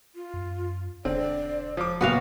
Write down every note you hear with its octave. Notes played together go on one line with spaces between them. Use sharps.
F4
F#2
E1 D3 C4 D5
F3 D6
F#1 A#2 B3 F#4 F5